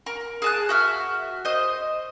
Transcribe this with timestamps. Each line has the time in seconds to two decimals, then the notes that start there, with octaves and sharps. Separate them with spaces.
0.06 A#4
0.42 G#4 A5 F#6
0.69 F#4 E5 F6
1.45 C5 D#5